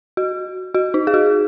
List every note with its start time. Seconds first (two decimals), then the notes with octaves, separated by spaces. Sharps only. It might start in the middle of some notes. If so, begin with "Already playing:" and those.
0.17 F#4
0.74 F#4
0.94 D#4
1.07 G#4
1.14 F#4